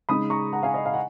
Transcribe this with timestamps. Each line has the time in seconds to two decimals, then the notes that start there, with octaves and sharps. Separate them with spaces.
0.09 C#3 G#3 D#4 B5 D#6
0.30 A#5 C#6
0.53 F#5 A#5
0.63 F5 G#5
0.74 D#5
0.86 F5
0.94 F#5